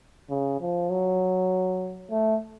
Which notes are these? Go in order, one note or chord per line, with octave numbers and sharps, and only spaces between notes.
C#3
F3
F#3
A3